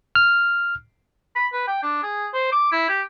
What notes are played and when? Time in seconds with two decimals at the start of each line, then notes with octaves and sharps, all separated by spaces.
0.15 F6
1.35 B5
1.53 B4
1.67 G5
1.83 D4
2.03 G#4
2.34 C5
2.52 D6
2.72 E4
2.89 G4